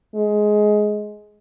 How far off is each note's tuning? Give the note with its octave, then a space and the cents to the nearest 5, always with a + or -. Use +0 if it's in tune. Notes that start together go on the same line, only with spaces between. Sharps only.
G#3 +15